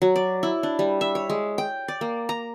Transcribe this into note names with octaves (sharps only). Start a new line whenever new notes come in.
F#3
D5
E4
D4
G3
E5
C#5
G#3
G5
D5
A#3
A#5